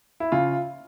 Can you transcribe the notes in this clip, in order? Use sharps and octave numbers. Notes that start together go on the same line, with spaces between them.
E4
C#3 F4